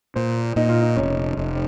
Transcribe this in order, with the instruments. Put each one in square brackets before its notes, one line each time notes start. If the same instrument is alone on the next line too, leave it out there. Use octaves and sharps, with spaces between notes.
[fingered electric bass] A#2 [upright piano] C5
[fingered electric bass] A#2 [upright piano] D#4
[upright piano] F4
D#4
[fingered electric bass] F1 [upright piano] C#4
[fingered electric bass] F1